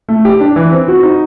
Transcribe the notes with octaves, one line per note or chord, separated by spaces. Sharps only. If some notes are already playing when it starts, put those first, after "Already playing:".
A3
G4
D4
E3
C4
F#4
D#4